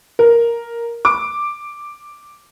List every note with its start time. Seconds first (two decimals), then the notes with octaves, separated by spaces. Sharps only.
0.19 A#4
1.05 D6